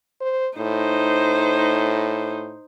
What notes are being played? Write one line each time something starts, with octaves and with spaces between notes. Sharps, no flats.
C5
A2 D#4 C5